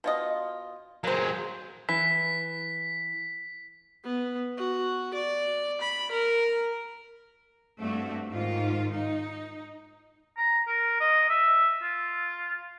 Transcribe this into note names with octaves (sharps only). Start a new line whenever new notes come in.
B2 F4 D#5
F#3 G#3 A#3 C5
E3 B6
B3
F#4
D5
B5
A#4
G2 A3 C4 F#4
G#2 D#3 F4
D#4
A#5
A#4
D#5
E5
F4